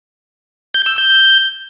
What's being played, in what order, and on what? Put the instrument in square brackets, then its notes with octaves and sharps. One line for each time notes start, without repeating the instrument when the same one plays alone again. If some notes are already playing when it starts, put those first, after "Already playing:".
[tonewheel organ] G6
E6
G6